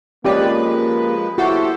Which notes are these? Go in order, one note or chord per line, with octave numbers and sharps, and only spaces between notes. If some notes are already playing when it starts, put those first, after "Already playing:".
F3 G#3 A#3 C#4 G4 B4 D5
E4 F#4 G4 A4 C5